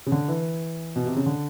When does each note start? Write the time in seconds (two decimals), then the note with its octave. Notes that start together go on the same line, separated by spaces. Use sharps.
0.06 C#3
0.12 D3
0.28 E3
0.96 B2
1.06 C3
1.16 C#3
1.26 D3